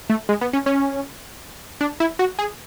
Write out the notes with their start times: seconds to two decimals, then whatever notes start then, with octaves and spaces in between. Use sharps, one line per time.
0.10 A3
0.29 G#3
0.41 B3
0.53 C#4
0.66 C#4
1.81 D4
2.00 E4
2.19 F#4
2.39 G#4